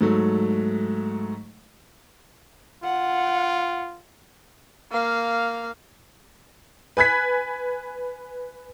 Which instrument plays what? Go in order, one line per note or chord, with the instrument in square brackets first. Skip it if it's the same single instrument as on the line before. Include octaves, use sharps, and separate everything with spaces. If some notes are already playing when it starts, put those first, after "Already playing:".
[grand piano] G#2 F#3 A3
[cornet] F4 [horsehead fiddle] F#5
[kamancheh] A#3 F5
[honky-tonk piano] B4 G#5 F#6 G#6 B6